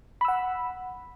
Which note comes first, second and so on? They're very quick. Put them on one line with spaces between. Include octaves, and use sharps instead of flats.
B5 E6 F#5